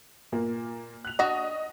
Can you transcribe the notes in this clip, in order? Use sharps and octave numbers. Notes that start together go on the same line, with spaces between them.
A#2 A#3
F#6 F7
D4 F#4 D#5